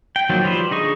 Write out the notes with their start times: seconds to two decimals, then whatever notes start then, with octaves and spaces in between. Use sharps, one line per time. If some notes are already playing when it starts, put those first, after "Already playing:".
0.16 G5
0.29 D#3 F3 F#3 A#3 F4
0.44 F3 G3 B4 C5
0.71 D3 D#4 G#4 C#6